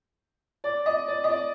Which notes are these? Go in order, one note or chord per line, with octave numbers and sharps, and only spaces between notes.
D5
D#5
D5
D#5
D5